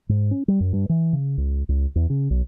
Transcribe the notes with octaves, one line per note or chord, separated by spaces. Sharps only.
G#2
C#4
G3
F#2
G2
E3
C#3
C#2
C#2
E2
C#3
B1